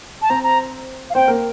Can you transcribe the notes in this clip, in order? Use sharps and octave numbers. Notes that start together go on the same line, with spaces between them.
A5
C4 C5 A#5
A#5
F5
C4 C5 G5
A#3 A#4